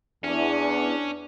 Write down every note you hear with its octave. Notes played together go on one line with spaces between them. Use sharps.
E2 C#4 D4